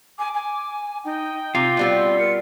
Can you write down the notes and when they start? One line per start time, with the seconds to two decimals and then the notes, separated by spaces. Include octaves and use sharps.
0.18 G#5 D6
0.34 G#5
1.04 D#4 G5
1.55 C3 F4
1.77 B2 G3 B3 C4
2.18 A#4 C#7